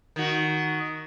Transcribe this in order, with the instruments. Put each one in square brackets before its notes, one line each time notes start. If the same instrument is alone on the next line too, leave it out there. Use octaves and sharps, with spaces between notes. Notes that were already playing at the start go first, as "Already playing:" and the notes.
[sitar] D#3 F#4